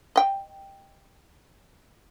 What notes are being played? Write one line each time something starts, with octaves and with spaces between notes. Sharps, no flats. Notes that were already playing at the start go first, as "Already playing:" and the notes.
D#5 G5